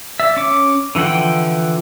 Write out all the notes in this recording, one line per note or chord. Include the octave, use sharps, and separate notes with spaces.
D5 E5
C#4 D6
D3 E3 F3 F#5 G5